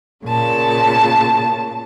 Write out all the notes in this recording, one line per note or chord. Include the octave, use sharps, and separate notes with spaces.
A#2 C#3 A5